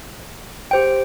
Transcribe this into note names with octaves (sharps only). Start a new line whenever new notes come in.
G4 C5 G5